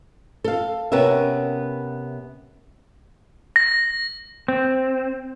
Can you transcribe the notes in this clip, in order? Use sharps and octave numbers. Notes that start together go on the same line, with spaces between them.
A4 F5
C3 B3 C#4 A#4 E5
A#6
C4